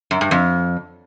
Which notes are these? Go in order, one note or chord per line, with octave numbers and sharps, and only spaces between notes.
F#2
G2
F2